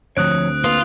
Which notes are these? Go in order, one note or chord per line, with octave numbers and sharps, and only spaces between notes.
D2 D3 F3 C4 C#5 D#6 F#6 D7
A#3 F4 B4 D#6